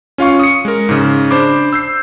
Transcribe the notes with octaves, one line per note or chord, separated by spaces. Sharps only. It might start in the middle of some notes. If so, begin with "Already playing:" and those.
C#4 F4 F5 C#6
D#6 C#7
G#3 A#4
G#2 C#3
D4 C5 B5 D6
E6 G6 C7